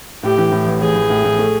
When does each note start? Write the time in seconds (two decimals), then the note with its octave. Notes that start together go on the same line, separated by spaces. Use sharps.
0.23 A2 G4
0.38 E3
0.52 A2
0.66 A1
0.81 A1 G#4
0.95 A1
1.10 A2
1.24 A2
1.39 A3